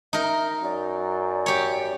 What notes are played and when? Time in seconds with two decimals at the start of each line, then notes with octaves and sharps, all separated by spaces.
0.13 D#4 A#4 E5
0.63 F#2 D5
1.46 G4 C#5